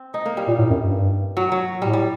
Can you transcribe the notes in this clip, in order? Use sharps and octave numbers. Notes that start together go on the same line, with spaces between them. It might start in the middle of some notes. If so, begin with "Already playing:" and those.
Already playing: C4
D#4
A#3
G3
A#2
A2
F#2
G2
F#3
F#3
A2 G3
G3